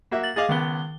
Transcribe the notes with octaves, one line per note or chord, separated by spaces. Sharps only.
A#3 F#4 E5
A6 F#7
G#4 D#5 F5 D6 A6
C#2 D#3 B3 G7